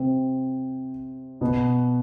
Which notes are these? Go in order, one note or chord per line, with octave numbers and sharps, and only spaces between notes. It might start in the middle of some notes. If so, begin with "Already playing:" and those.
Already playing: C3 C4
B2 B3